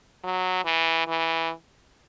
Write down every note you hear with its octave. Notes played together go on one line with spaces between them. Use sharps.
F#3
E3
E3